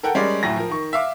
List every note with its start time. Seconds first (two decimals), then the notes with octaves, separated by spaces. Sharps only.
0.03 A4 A#4 F#5 G5
0.15 G3 G#3 C#4 A#4 D5
0.43 D2 A2 F#3 A#6
0.56 F3 A#4
0.70 D#3 C#6
0.93 E5 F5 D6